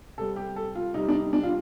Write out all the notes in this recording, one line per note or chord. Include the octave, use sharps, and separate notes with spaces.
C3 G3 A4
G4
A4
F4
C3 G3 D#4
D4
D#4
D4
F4